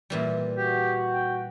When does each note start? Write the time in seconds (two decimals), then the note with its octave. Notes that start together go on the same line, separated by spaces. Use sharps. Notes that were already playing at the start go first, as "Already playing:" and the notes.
0.10 A#2 E3 G3
0.57 F#4 G4
1.13 G5